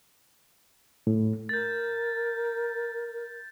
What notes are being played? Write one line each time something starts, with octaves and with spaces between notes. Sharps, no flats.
A2
A#4 G6 A6